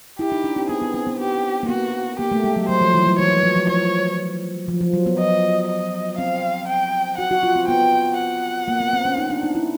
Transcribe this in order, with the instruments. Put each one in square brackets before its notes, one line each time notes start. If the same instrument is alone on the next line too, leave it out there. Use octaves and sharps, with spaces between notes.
[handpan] E4 [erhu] G4
[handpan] D#4
D4
C4
[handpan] B3 [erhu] G#4
[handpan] B3
C4
B3
[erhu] G4
[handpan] A#3
[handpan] B3 [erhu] F#4
[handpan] A#3 [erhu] G4
[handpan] A3
G#3
F#3
[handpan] F#3 [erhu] C5
[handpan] F3
E3
F#3
[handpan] E3 [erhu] C#5
[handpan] F3
F#3
F3
[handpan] F3 [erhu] C#5
[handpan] F3
F3
F#3
B3
[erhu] D#5
D#5
[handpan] C4 [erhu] F5
[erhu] G5
[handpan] F#4 [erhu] F#5
[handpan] F#4
F4
C4
[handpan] B3 [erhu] G5
[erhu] F#5
[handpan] A#3
B3
C4
C#4
D#4
D4
D#4
E4